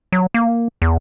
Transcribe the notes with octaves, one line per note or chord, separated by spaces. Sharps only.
F#3
A#3
E2